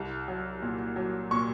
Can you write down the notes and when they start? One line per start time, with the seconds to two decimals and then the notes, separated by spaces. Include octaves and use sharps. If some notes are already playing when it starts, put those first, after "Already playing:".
Already playing: C2
0.28 F#3
0.62 A#2
0.96 F#3
1.31 A#2 C#6